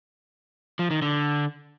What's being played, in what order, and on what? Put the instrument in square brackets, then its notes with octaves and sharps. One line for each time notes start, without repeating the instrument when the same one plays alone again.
[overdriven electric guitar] F3
D#3
D3